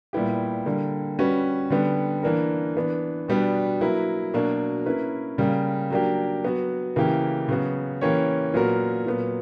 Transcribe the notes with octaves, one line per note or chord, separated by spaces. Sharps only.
A#2 G3 B3 E4 G4
D3 G3 A#3
G3 C#4 F#4 B4
D3 G3 B3
E3 A#3 D4 A#4
E3 B3 D4
B2 G3 B3 D4
F#3 A#3 E4 B4
B2 F#3 A#3 D4 F#4
A#3 C#4 E4 B4
C#3 G3 A#3
F#3 A#3 D4 G4
F#3 B3 F#4
C#3 E3 A#3 E4 G4
C#3 F#3 B3 F#4
E3 A#3 C#4 G4 C#5
A#2 F#3 B3 F#4 A#4
A#2 F#3 B3